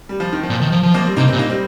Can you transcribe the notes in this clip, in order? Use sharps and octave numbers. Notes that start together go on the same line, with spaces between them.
G3
F3
D#3
F3
A#2
D#3
F3
F3
F3 A#3
G3 C4
C3 A#3 D#4
G3 C4
A#2
A#3 D#4
G3 C4